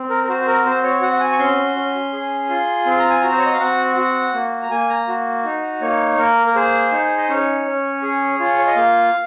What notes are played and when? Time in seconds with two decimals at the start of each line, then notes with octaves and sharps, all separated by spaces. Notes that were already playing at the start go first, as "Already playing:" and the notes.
Already playing: C4
0.10 A#4
0.24 A#4
0.28 F#4 C5
0.41 C5
0.47 A#4
0.65 C4 C5
0.83 C#5
1.02 F#4 F#5
1.13 F#5
1.20 G#5
1.32 C#6
1.39 C#4 C6
1.76 C#4
2.13 G#4
2.49 F4
2.86 C4 C6
2.98 A#5
3.10 G#5
3.21 F#4 A#5
3.32 C5
3.38 C#5
3.46 D#5
3.53 F5
3.60 C4 F#5
3.97 F#4
4.34 A#3
4.62 A#5
4.71 A#3 G#5
4.90 A#5
5.08 F#4
5.45 D#4
5.81 A#3 C#5
6.18 A#3 A#4
6.47 A#4
6.55 G#4 C5
6.92 D#4
7.17 D#5
7.28 C#4 C#5
7.65 C#4
8.02 G#4
8.40 F4
8.58 C#5
8.67 D#5
8.76 A#3 F5